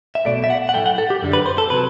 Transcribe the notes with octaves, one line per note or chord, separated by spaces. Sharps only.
E5
B1 B2 A3 D5
E5
F#5
F#5
A2 F#3 A3 G5
F#5
A4
G4
F#2 D3 G3
B4
C5
A4
C3 F#3 B4